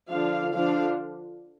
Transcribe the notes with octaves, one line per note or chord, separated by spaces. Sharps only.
D3 F3 D4 F5
D3 F3 D4 F5